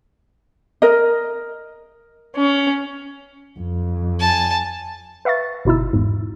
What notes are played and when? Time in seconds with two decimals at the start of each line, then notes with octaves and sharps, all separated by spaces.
0.82 A#4 D#5
2.36 C#4
3.60 F2
4.19 G#5 A5
5.25 B4 E5 F5 C#6 A6
5.65 G1 B2 D#4 E4 E6
5.93 E2 G#2